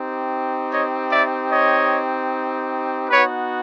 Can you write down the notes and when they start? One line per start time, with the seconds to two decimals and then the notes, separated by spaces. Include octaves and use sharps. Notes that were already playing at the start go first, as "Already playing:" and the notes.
Already playing: C4 D#4 G4
0.71 C#5 D#5
1.11 D5 E5
1.50 C#5 D#5
3.10 B3 D#4 F#4 B4 C#5